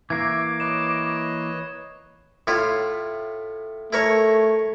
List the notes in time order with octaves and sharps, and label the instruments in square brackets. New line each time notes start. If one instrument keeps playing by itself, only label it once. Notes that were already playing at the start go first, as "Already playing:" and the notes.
[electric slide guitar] E3 A#3 [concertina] E5 C#6 [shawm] D6 [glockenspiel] G#6
[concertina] B4 C#5 D#5 [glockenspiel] E7
[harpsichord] A2 E4 F4
[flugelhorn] A3 [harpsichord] E4 A#4 C#5